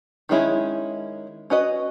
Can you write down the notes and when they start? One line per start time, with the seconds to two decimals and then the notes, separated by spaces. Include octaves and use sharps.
0.29 D#3 G#3 C#4 E4
1.50 C#4 F#4 B4 D#5